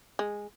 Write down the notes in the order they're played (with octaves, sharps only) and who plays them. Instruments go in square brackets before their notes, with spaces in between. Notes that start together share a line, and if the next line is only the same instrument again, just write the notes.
[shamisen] G#3